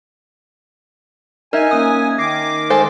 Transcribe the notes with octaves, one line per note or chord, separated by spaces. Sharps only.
D#4 A#4 E5 G#5
A#3 C#4 D#6
D#3 D6 A#6 C7
G#3 A4 C5